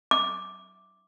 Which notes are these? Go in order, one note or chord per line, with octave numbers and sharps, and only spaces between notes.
D6